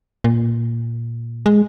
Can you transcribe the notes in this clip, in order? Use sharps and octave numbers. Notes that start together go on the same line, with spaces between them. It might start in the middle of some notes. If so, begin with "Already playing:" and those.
A#2
G#3